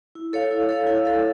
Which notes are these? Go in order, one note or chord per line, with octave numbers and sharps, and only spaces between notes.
E4
A4 C#5 F5
E4
A4 C#5 F5
E4
A4 C#5 F5